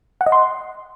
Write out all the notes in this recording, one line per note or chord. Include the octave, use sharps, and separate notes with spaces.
F#5
D#5
C6